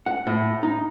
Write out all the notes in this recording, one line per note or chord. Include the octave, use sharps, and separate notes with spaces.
F#5
A2
D#4